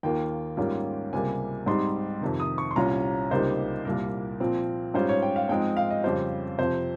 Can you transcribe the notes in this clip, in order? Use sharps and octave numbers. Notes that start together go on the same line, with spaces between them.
D#2 D#3 A#3 F4 G5
G#2 G3 A#3 C#4 F4
C#2 C3 G3 A#3 G#5
G#2 G3 C4 D#4 C6
F2 C3 D#3
D#6
C#6
C6
C2 A#2 G3 C#4 F4 A#5
C#2 C3 G3 A#3 D#4 C5
C2 A#2 G3 A#3 A#4
A#2 F3 C4
G#2 G3 C#4 F4 C5
C#5
G5
F5
G#2 F3 G#3 C4 D#4 G5
F5
D#5
F2 C#3 G3 C4 F4 C5
F2 C3 F3 C4 C5